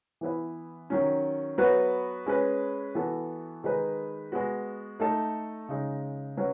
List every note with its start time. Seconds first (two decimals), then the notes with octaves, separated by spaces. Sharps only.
0.21 E3 B3 E4 B4
0.90 D#3 F#3 C#4
1.58 F#3 B3 F#4 B4
2.26 G#3 C#4 G#4 B4
2.95 E3 B3 F#4 A4
3.64 D#3 G#3 D#4 G#4 B4
4.32 G#3 B3 F#4
5.00 A3 D#4 A4
5.69 C#3 G#3 D#4
6.37 F#3 C#4 F#4 B4